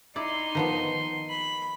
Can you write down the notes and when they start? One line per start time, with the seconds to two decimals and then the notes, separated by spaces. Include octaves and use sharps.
0.16 D#4 E4 D5 C6
0.55 D#3 F3 B3
1.30 B5